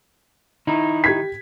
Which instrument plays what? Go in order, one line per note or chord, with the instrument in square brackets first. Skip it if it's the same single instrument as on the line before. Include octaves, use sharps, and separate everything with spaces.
[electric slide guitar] D#3 D#4 E4
[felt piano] G4 G#6 B6